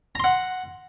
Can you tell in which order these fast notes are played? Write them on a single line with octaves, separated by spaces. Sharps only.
A#5 C6 F#5